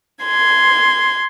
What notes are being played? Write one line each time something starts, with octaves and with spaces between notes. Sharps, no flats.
C6 G#6